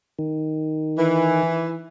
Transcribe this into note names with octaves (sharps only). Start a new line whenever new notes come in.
D#3
E3